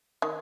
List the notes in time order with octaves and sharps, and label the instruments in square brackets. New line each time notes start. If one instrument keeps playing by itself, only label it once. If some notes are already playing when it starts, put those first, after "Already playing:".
[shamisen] D#3